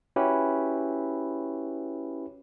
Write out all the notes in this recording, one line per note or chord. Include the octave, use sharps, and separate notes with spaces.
C#4 E4 F#4 G4 B4